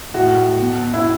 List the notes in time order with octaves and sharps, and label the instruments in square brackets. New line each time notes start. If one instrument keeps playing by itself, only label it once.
[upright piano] A2 F#4
A2
B2
B2
E4